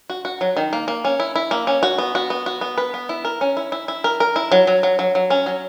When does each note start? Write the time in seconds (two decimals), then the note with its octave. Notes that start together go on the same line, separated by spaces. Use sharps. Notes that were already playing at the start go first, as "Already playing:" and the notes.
0.10 F#4
0.25 F#4
0.41 F#3
0.57 D#3
0.73 A#3
0.88 A#3
1.05 C#4
1.20 E4
1.36 E4
1.51 A#3
1.67 C#4
1.83 F#4
1.98 B3
2.15 F#4
2.30 B3
2.46 F#4
2.61 B3
2.78 B4
2.94 B3
3.09 E4
3.25 A#4
3.41 C#4
3.57 E4
3.72 E4
3.88 E4
4.04 A#4
4.20 A#4
4.36 E4
4.52 F#3
4.67 F#3
4.83 F#3
4.99 F#3
5.15 F#3
5.30 C#4
5.46 F#3